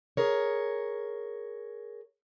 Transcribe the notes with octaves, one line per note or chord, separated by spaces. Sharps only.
G#4 A#4 C#5